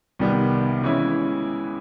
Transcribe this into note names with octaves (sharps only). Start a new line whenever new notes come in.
C2 C3 D#3 G3 B3
C#3 E3 G#3 C#4 E4